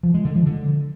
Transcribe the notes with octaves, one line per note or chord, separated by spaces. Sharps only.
F3
G#3
D3
F3
D3